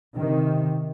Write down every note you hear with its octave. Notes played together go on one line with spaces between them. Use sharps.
C3 D#3